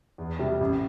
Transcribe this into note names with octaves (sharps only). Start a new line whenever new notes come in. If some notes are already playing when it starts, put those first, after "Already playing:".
E2
C3 G3
A1